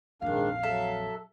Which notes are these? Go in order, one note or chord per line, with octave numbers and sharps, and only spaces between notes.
A#1 F2 G#2 D#3 D4 F5
F#3 A4 E5